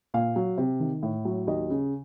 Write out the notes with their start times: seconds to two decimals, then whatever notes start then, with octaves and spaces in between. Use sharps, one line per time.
0.14 A#2 F5
0.36 F#3
0.58 C3
0.80 D#3
1.03 A2
1.25 F#3
1.47 D#2 D#5
1.70 C#3